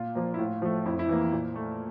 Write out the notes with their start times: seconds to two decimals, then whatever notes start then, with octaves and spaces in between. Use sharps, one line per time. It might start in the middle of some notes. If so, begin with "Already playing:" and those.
Already playing: A#2 F4
0.15 F3 A#3
0.34 E4
0.38 A2 F4
0.62 F3 A3
0.86 F2 E4
0.99 E4
1.09 E3 A#3
1.32 A#2
1.56 A3